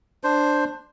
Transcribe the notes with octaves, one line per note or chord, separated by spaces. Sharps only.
D4 C5